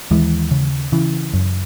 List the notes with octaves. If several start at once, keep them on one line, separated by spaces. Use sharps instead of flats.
D#2 E3 G#3
C#3
C#3 E3
F#2